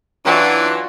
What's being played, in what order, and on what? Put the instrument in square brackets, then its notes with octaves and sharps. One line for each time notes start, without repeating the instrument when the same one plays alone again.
[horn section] E3 [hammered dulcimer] F#3 F4 F#4 [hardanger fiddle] D4